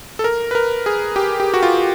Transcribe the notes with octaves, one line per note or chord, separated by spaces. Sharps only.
A4
A#4
B4
A#4
G#4
G4
G4
F#4
F4